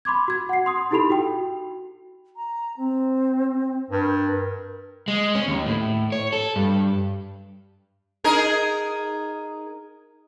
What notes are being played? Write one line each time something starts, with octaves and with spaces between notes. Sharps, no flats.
B5 C6 D6 G#6
F#4 G#6
F#5 C7
C6 D#6
D#4 E4 G4 A4 B5 F7
F#4 G5
A#5
C4
G2 A#4
G#3
C#4
D#2
A2
C#5
A4
G2
D#4 G#4 A#4